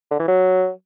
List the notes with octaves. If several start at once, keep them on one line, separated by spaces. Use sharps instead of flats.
D3
E3
F#3